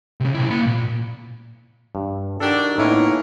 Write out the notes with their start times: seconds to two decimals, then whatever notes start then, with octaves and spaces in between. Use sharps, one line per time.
0.20 C2 C#3
0.35 B1 E4
0.50 A#3 B5
0.66 A#2
1.95 G2
2.40 D#3 D4 F#4 G4 A4
2.78 A2 A#3 B3 C#4 D#4 E4 C#5